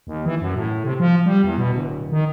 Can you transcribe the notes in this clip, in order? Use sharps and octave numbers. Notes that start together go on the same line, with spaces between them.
D#2
E3
F#2
A2
C3
F3
G3
E2
B2
D1
D#3